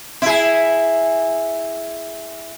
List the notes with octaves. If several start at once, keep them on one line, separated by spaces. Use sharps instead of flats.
E4 G#4